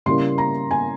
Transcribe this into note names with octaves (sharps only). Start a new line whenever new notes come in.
C#3 G3 A#3 E4 C6
A#5
G#5